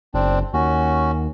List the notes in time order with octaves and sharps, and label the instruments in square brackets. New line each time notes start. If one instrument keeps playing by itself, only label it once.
[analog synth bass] F#1 [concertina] C4 D4
[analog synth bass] D#2 [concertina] C#4 F#4